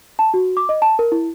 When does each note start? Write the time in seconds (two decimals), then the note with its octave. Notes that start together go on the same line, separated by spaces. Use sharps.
0.19 A5
0.34 F#4
0.57 D6
0.69 D#5
0.82 A5
0.99 A#4
1.12 E4